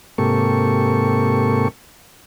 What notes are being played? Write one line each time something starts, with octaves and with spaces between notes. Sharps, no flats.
G#2 C3 A#3 G4 A4 C#6